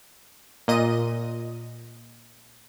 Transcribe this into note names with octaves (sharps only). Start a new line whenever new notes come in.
A#2 D#5 D#7